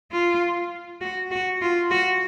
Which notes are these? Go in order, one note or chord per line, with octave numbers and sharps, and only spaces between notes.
F4
F#4
F#4
F4
F#4